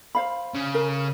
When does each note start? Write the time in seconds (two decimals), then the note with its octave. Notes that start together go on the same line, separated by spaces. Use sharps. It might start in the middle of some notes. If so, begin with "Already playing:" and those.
0.15 C5 F5 B5
0.55 C#3
0.74 A#4